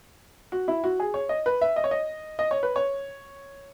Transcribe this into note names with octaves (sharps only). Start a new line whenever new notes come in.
F#4
E4
F#4
G#4
C#5
D#5
B4
E5
D#5
C#5
D#5
D#5
C#5
B4
C#5